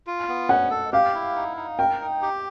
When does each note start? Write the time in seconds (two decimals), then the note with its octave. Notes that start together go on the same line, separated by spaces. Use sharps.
0.07 F4
0.28 B3
0.49 C#4 F#5
0.71 A4
0.92 G4 F5
1.15 E4
1.36 D#4
1.57 D#4
1.78 A#4 G5
2.01 D#4
2.22 G4